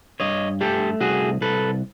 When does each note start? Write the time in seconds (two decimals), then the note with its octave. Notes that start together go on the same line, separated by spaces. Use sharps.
0.20 G2 C#5 D#5
0.61 A3 G4 A4
1.01 C2 F#4 G#4
1.41 C2 A4 B4